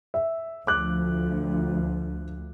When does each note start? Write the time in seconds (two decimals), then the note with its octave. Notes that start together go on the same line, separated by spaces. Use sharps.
0.14 E5
0.67 D2 F3 D6 F#6